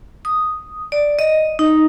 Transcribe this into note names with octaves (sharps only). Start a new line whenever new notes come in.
D#6
D5
D#5
D#4